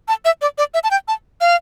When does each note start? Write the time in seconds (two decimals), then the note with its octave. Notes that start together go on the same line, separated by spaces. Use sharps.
0.08 A5
0.25 E5
0.42 D5
0.58 D5
0.74 E5
0.84 A5
0.91 G5
1.08 A5
1.41 F5